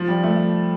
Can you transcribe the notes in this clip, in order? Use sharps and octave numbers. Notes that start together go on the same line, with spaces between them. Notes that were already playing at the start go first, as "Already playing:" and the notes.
Already playing: F3
G3
A3